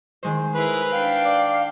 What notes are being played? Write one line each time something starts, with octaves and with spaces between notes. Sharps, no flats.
D#3 G#3 C5
E4 G#4 A#4 B4
D4 F5 G5
D5